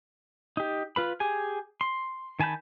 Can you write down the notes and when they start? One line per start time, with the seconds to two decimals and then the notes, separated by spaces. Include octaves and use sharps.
0.57 D#4 G4
0.96 F4 B4 B5
1.20 G4 G#4 G#5
1.81 C6
2.40 D#3 G#5 A5 B5 G6